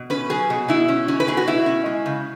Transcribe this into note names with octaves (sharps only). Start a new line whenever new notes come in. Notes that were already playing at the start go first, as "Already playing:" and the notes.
Already playing: B2
C#4 B4
F#3 G#4
B2
B2 E4
C#4
F#3 C#4
B4
B2 G#4
F#4
B2 E4
C#4
G#3
C#3